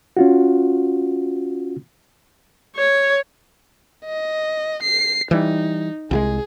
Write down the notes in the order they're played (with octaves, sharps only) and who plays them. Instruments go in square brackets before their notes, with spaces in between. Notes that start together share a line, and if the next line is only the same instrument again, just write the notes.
[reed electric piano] C#4 F4 F#4
[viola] C#5
[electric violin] D#5
C7
[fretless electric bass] E3 G3 [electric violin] D#4
[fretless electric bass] C2 F3 G#3 [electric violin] G#4